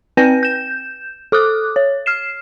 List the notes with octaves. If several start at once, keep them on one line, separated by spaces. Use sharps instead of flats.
C4 B4 G5 A#6
G6 E7
A4 D6 D#6 F#6
C#5
F6 C7 E7